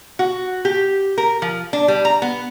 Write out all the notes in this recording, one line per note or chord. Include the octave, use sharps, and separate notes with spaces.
F#4
G4
A#4
F3
D4
G3
A#5
B3